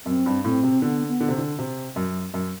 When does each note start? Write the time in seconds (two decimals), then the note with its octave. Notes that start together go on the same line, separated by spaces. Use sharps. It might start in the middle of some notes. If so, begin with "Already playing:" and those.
0.06 F#2 C4
0.26 G2
0.44 A2 C4
0.63 C3
0.82 D3 B3
1.08 B3
1.20 D3
1.29 C3
1.38 D3
1.59 C3
1.96 F#2
2.34 F#2